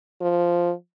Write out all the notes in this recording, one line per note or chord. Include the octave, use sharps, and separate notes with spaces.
F3